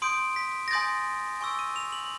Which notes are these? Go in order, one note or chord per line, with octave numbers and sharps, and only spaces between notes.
C6 D#6 G6 D7
B6
A#6
G#5 C6 D#6 G6 A6
G#5 C#6 E6
D#7
F7
F#7